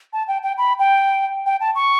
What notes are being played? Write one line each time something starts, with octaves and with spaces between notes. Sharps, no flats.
A5
G5
G5
B5
G5
G5
A5
C#6